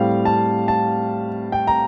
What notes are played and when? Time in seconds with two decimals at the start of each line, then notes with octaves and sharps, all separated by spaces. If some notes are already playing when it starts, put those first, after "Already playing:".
Already playing: A2 G3 C4 F5
0.25 A5
0.68 A5
1.52 G5
1.67 A#5